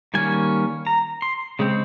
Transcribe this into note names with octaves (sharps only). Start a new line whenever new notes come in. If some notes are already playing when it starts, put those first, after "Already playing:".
D#3 G3 A#3 C#4 G#5
A#5
C6
C#3 G#3 C4